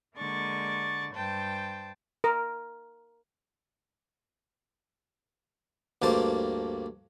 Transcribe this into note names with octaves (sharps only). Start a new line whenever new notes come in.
D3 G#3 A#3 D5 C#6 A6
G2 C5 G5 A5
A#4
D2 G2 A#3 C5 A5